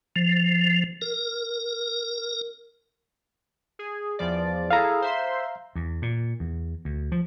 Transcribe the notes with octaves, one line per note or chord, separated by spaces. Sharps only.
F3
A#4
G#4
E2 F3 D5
E4 G#4 A4 F5 A#5
C5 E5 C6
E2
A#2
E2
D2
F3